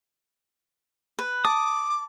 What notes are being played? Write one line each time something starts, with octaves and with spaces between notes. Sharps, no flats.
B4
A5 D6 D#6